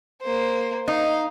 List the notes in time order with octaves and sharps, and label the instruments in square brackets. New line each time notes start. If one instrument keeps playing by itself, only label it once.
[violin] A#3 C5
[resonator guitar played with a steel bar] D#4 [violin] F5